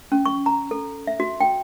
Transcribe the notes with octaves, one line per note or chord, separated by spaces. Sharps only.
C#4
C#6
A#5
A4
E5
F#4
G5